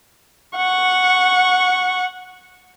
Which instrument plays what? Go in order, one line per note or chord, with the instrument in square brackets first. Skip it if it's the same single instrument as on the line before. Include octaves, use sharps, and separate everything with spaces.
[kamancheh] F#5 C#6